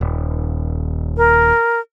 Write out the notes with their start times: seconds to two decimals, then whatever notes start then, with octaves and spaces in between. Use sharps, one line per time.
0.01 D#1
1.17 A#4